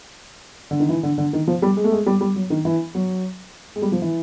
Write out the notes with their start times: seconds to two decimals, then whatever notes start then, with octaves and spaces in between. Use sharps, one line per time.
0.71 D3
0.80 D#3
0.89 E3
1.03 D3
1.18 D3
1.33 D#3
1.48 F3
1.62 G3
1.77 G#3
1.84 A3
1.92 G#3
2.06 G3
2.21 G3
2.36 F#3
2.50 D#3
2.65 E3
2.95 F#3
3.76 G#3
3.82 G3
3.92 F3
4.02 E3